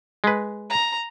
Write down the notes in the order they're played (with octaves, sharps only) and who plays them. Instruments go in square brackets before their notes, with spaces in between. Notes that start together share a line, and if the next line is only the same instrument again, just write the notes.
[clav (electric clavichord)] G#3 B4
[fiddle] A#5